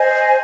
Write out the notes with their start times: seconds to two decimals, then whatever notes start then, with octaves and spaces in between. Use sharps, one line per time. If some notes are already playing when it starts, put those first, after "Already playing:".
Already playing: C5 D#5 G#5